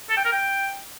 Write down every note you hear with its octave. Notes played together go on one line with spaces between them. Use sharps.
A4
G5
A#4
G5